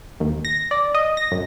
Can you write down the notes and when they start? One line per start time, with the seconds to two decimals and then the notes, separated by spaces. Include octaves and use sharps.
0.20 D#2
0.45 A#6
0.71 D5
0.95 D#5
1.17 A#6
1.32 F#2